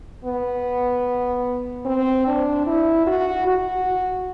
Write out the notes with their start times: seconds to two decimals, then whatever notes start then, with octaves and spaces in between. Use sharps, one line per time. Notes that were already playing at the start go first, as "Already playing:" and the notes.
0.25 B3
1.85 C4
2.27 D4
2.66 E4
3.07 F#4
3.47 F#4